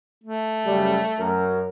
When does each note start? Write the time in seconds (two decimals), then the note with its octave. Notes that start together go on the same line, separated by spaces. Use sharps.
0.24 A3
0.65 F#2 C#3 G3
1.19 F#2 A#4